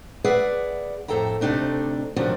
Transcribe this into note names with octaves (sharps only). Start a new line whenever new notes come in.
G#4 B4 D5 E5 F#5
F2 A2 A4 E5 G5 A#5
D2 C3 A3 D4 D#4
C3 D#3 F3 F#3 C#4 D4